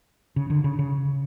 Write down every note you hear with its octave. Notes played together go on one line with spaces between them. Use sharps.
C#3
D3
C#3
C#3